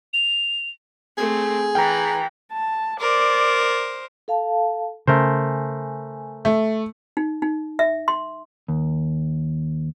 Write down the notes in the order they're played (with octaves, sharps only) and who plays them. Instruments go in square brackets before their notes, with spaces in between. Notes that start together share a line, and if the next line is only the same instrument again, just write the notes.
[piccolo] F7
[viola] A3 C4 [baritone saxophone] G#4
[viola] E3 [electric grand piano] G5 A#5
[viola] A5
[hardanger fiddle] A#4 C5 [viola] D5
[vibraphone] A4 F5 A5
[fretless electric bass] C#3 [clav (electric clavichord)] A3 A#4 C5 [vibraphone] G#5
[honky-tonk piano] A3
[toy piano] D#4
D#4
E5
C6
[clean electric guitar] D#2